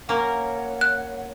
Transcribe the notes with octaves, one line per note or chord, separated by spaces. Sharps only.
A#3 C#4 A#4 C#5 F#5
F#6